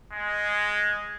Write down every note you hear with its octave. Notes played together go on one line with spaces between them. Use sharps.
G#3